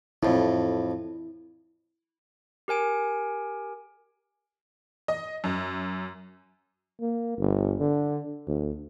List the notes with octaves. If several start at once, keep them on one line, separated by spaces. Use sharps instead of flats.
F2 A2 E4
G4 A#4 G#5 D7
D#5
F#2
A#3
G1
D3
D2